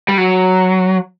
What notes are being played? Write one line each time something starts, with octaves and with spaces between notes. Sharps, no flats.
G3
F#3